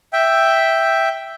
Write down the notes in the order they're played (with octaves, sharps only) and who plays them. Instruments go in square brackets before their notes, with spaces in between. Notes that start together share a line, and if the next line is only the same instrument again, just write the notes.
[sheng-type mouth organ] E5 G5